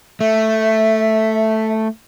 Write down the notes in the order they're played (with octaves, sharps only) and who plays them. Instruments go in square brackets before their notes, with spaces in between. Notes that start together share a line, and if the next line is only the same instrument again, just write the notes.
[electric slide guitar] A3 [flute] E5